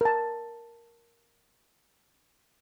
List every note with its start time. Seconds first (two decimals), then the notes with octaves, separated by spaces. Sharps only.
0.01 A#4 A5